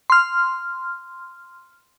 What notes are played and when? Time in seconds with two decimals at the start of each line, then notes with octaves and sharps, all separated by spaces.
0.10 C6 F6